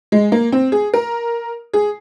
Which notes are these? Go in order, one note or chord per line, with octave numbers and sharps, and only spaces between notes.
G#3
A#3
C4
G#4
A#4
G#4